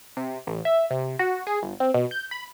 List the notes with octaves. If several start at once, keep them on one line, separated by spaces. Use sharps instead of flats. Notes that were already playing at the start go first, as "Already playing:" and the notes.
C3
A1
E5
C3
F#4
G#4
G1
C4
B2
G6
B5